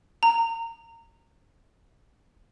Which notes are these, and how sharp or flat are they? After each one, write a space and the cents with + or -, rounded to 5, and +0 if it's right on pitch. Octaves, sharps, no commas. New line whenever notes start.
A#5 -25